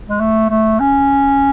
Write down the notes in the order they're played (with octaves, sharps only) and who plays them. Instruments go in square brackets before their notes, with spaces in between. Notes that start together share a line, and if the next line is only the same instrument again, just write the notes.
[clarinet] G#3
A3
A3
C#4